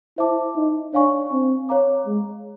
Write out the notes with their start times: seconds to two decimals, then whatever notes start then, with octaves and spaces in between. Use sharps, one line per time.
0.18 E4 C5 E5 A5 D6
0.56 D#4
0.94 D4 C#5 F5 G#5 C#6
1.31 C4
1.69 C#5 F5 A#5 D6
2.06 G#3